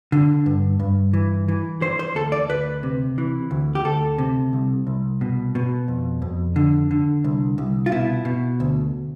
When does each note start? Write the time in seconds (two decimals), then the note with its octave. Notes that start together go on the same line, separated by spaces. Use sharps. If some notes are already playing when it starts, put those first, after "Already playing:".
0.12 D3
0.46 G2
0.80 G2
1.13 E3
1.48 E3
1.82 E3 C5
1.99 C5
2.15 D2 A4
2.32 D5
2.49 D2 B4
2.83 C3
3.18 E3
3.51 D2
3.75 G4
3.84 D2 A4
4.18 C3
4.53 C2
4.87 C2
5.21 B2
5.55 B2
5.88 F2
6.22 F2
6.56 D3
6.91 D3
7.24 C2
7.58 C2
7.86 F4
7.92 B2 E4
8.25 B2
8.60 D2